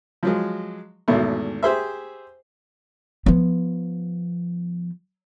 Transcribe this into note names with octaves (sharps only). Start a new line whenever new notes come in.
F3 F#3 G#3
G#1 E2 B2 A3
G4 G#4 C5 E5
F3 B3